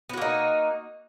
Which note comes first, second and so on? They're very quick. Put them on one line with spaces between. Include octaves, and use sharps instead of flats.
B3 F#4 A#3 D#4